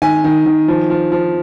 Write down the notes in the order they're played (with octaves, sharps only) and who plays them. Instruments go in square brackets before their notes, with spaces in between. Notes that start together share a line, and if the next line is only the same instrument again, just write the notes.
[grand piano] D#3 G#5
D#3
D#3
F3
F3
F3